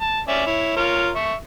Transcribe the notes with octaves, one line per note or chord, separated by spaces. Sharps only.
A5
C#4 D5 E5
E4 C#5
F4 A#4 C#5
E5 C#6